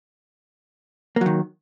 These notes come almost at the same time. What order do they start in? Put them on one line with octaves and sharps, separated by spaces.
A#3 F#3 D#3